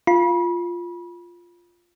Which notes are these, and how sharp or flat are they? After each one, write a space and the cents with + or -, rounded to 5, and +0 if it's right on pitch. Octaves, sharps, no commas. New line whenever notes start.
F4 +0 B5 -30